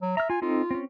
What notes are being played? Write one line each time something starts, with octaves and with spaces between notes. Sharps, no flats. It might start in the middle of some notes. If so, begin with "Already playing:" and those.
F#3
E5 A#5 F6
F4 G#5
C4 D#4 F4 A4
C4 C#4